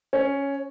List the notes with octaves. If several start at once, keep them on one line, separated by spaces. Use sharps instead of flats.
C#4